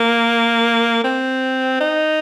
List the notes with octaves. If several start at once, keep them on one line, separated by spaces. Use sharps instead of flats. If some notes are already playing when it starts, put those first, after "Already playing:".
Already playing: A#3
C4
D#4